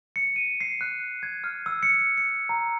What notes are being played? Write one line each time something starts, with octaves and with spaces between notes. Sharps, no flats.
C#7
D#7
C7
F#6
G#6
F6
E6
C#7
C#7
A#5